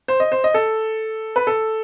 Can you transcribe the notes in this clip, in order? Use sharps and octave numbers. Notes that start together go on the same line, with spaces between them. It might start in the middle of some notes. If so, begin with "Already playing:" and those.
C5
D#5
C5
D#5
A4
B4
A4